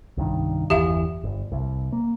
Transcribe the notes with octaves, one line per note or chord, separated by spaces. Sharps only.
C2 G2 D#3
G1 E2 E3 G4 E5 F5
G1
C2
A#3